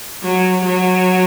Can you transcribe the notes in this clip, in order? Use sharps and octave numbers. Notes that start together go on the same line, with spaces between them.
F#3
F#3